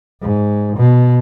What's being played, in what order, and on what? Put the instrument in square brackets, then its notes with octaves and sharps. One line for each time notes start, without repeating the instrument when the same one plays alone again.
[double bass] G#2
B2